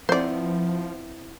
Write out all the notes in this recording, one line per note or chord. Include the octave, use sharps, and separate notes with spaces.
F3 B3 C4 E4 C5 D5